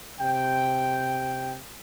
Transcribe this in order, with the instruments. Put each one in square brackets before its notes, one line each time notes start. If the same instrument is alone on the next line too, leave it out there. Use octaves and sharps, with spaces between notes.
[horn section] C3 G5